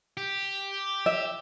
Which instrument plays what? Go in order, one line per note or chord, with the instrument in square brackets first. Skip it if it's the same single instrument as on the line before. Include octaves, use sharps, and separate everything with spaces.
[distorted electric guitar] G4
[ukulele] E5